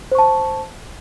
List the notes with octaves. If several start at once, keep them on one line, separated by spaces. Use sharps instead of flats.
C5 A5 C#6